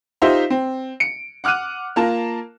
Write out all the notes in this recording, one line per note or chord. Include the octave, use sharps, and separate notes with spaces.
D#4 F4 G4 C5 E5
C4
C#7 D7
F#5 D6 F6 F#6 D#7
A#3 F4 A#4 A5